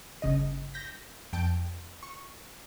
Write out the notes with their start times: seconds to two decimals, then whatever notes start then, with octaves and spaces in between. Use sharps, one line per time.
0.22 G1 C#3 D#5
0.74 G6 A#6 B6
1.33 F2 G5 A5 D7
2.03 C#6